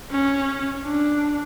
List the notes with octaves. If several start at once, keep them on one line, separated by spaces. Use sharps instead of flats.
C#4
D4